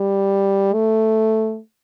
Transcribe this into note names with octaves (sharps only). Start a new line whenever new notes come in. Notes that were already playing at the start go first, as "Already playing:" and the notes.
Already playing: G3
A3